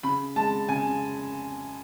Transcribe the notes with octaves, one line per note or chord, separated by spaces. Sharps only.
C#3 B5
G#3 A5
C#3 G#5